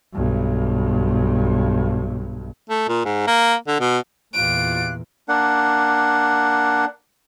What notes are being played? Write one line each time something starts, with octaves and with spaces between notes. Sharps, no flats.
B1 G2
A3
A#2
G#2
A#3
D3
B2
E2 A#2 F4 G4 F#6 D7
A#3 D4 F#5